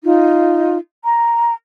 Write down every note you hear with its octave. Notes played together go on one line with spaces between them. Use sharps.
D#4 F4
A#5